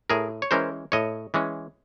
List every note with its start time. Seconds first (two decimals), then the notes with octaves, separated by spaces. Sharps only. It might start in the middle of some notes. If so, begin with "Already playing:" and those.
0.10 A2 G#4 A#4
0.42 C#5
0.51 E3 G#3 C#4 A#4 C5
0.92 A2 C#5 D#5
1.34 E3 G#3 C#4